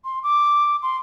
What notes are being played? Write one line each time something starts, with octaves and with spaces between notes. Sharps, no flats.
C6
D6
C6